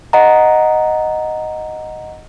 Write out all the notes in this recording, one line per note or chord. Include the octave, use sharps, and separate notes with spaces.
D#5 F#5 A#5